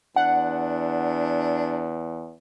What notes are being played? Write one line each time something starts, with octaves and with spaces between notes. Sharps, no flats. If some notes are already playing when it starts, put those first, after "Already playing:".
E2 D4 F#5